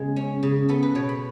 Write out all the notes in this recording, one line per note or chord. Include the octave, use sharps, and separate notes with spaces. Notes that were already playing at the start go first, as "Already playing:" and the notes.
Already playing: C#3 G#3 B3
C#4
C#3
B3 A4
B4
B2 C#5
B5